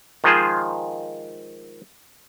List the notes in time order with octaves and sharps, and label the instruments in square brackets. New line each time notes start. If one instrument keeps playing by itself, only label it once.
[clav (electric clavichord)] D#3 F3 G#3 F4 G#4 C5